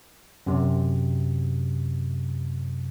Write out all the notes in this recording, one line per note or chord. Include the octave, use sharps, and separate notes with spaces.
F#2 C3